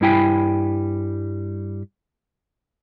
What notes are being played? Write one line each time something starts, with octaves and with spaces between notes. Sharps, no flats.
G2 G3 E4 G5 G#5 B5